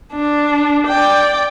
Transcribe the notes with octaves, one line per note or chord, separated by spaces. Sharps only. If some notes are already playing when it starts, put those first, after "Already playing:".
D4
D5 G5